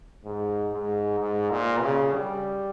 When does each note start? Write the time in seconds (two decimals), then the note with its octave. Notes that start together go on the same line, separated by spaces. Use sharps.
0.25 G#2
0.73 G#2
1.19 G#2
1.51 A#2
1.82 C#3
2.13 G3